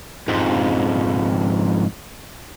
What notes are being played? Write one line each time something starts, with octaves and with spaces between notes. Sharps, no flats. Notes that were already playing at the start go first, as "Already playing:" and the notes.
F2 G#2